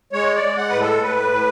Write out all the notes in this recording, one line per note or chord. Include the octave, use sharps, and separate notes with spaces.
G#3 C#5
D5
G#3
F#5
A2 B4
A4
A2 B4
A2